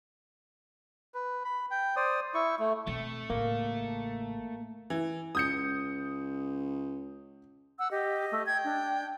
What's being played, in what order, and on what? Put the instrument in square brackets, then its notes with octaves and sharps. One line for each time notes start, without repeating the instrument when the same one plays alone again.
[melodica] B4
B5
G5
C5 D5 D#6
E4 C#6
A3
[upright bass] B2 C4 [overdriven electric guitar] A3
[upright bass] A1 C#3 [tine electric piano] A#3
[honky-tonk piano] E3
[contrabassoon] C#2 [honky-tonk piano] D#6 G6 C#7
[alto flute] F#5 [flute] E6
[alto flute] G4 [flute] D#5
[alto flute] A3
[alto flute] G5 [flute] G#6
[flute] D4